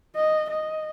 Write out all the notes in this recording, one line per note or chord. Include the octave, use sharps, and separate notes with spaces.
D#5
D#5